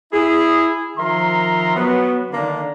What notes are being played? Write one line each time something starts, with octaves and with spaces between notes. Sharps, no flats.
E4 G#4
D#3 F3 A#4 E5 A#5 C6
F#3 B3
D3 D#3 A#3 D4